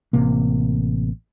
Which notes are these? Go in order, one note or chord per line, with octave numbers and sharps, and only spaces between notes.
A1 C3 A#3